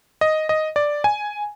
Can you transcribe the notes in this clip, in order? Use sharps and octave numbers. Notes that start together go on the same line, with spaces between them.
D#5
D#5
D5
G#5